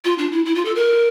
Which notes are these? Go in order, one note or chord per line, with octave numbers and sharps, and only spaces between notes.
F4
D4
E4
E4
F4
A4
A#4